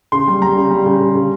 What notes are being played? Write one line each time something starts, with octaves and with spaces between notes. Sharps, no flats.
C#3 C6
G3
G3 A#5
C#3
G3
C#3
C#3
C#3